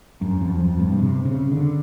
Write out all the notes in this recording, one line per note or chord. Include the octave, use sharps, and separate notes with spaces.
F#2
F2
F2
G2
B2
C3
C#3
D3